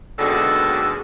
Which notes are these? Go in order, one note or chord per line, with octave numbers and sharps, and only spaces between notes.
D#2 B2 D3 G#3 F#4 A4